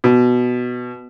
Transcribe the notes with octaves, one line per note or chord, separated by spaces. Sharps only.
B2